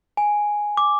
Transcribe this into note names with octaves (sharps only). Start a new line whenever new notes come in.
G#5
D6